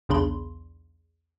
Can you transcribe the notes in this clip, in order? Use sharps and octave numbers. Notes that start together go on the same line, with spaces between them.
B1 E2 C#3 D4 B5 C6